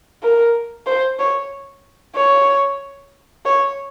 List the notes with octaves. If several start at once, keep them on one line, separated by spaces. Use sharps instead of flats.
A#4
C5
C#5
C#5
C#5